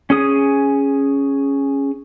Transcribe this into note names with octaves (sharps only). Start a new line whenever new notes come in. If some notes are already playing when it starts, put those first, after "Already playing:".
C#4 G#4 D#6